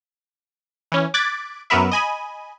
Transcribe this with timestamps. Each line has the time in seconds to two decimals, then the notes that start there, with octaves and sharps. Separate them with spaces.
0.92 E3 C#4
1.14 D6 F#6 G#6 A6 B6 D7
1.70 F#2 F#3 B3 A#4 B4 E5
1.91 D#5 G#5 B5